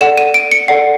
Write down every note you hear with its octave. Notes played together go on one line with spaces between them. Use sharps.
A4 D5 F#5 E7
D#7
D7
C#7
A4 D5 F#5 C7